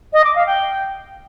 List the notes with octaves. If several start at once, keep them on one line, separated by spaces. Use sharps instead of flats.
D#5
D6
F5
G5